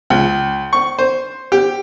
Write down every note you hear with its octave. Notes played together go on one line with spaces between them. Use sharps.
C#2
C#6
C5
G4